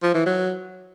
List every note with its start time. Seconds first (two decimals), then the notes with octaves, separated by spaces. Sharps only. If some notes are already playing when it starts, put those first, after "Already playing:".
0.02 F3
0.14 E3
0.26 F#3